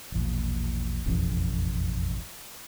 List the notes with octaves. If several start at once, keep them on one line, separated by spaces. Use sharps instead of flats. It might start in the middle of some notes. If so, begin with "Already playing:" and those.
E1 A#1 A#2
E1 A1 F2